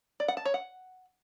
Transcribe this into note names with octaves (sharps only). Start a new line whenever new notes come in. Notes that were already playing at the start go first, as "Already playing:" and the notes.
D5
F#5
A5
C#5
F#5